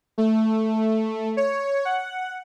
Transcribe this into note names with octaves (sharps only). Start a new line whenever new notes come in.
A3
C#5
F#5